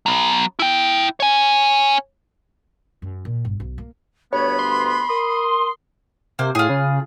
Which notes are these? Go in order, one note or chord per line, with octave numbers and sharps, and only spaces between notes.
F#3 B3
E4 G5
C#5 G#5
F#2
A#2
G1
B1
A#3
D2 G2 B3 C#5 B5
C6
A#4 D#6
C3 A#3 C5
A2 F4 G#4
C#3